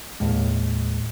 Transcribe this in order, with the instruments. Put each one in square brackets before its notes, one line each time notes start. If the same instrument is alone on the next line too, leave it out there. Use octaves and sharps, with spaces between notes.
[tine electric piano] D#2 A2 G#3